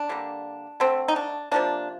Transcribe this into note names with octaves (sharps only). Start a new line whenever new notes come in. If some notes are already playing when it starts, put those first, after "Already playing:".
Already playing: D4
D3 G3 A#3
D3 A3 C4
D#4
D4
C3 F3 A#3 D4